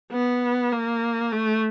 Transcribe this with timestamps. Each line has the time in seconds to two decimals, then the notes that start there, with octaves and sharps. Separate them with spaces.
0.12 B3
0.72 A#3
1.32 A3